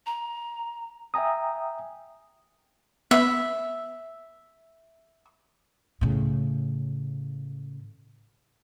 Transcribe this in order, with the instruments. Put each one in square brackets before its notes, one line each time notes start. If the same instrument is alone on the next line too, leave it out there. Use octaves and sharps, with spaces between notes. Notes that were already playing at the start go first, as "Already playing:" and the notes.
[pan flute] A#5
[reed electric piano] E5 G5 G#5 A#5 D#6
[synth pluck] B3 B5 [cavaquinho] E5
[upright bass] A2 C#3